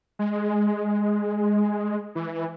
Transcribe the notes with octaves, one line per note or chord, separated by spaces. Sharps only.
G#3
E3